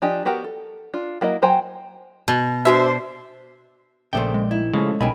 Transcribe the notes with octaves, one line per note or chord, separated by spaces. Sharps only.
F3 D4 G4 D#5 G#5
B3 F#4 G4 A#4 F#5
A4
D4 F4
F#3 A#3 E4 D#5
F#3 C5 G5 G#5 A#5
B2
G#3 C#4 D4 F#4 B4 C5 E5
A#1 C#3 A3 C5 D5 E5 G5
G#3
D#4 E4
C#3 F3 G#3 A3 C#4
B1 C#3 D#4 A#4 G5 G#5 B5